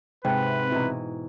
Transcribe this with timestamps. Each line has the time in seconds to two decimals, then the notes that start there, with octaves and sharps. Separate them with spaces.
0.25 G#2 C3 B4 F#5 G5 A5
0.72 B2 E3 E4 A#5